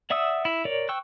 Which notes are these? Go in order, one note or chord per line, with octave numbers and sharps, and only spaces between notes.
D5 E5 F#5 D#6 E6
E4
A#4 C#5 D5
C5 G5 C#6 E6 F#6